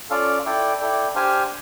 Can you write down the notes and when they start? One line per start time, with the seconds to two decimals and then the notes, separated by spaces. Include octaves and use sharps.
0.10 C#4 F4 A4 D5 F5
0.45 E4 A4 D5 G5
0.80 E4 A4 D5 G5
1.15 D4 G4 C5 F5 G#5